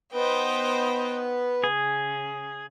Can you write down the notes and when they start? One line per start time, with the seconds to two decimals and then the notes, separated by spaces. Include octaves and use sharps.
0.13 B3 D#4 B4 C5 G5
1.64 C#3 G#4